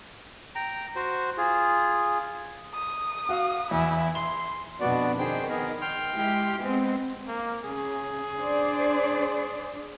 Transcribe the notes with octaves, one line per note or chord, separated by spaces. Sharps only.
G5 A#5
F#4 C5
F4 G#4
D#6
F#4 F5 F#5
E2 E4
C6 G7
F2 B2 B3 D4 F#4 D5
D#3 G#4 C5 G5
B3 G#4 A#4
G5 C6 F6
G#3 E4 G4
G#3 B3 C4
A#3
C#3 G#4
D4 C5 D5